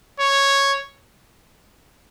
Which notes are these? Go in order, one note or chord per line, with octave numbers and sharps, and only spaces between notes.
C#5